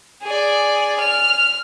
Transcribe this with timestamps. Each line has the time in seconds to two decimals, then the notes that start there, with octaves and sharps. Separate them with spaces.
0.23 G#4 D5
1.00 F6